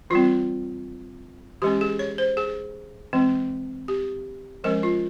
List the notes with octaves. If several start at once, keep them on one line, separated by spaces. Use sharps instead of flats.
E3 G3 C4 F4
E3 G#3 C#4 G4
G#4
C#5
C5
G#4
E3 G#3 C4
G4
F3 G#3 C#4 A#4
F4